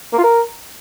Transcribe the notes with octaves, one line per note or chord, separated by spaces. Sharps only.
A#3
F4
A#4